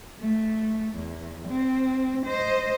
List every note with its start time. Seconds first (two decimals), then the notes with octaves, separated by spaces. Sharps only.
0.19 A3
0.96 E2
1.48 C4
2.26 C5 D#5